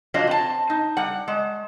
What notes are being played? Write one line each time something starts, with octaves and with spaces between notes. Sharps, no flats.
F2 F#3 D4 F4 D#5
C4 A5
D#4
G3 F#5
G#3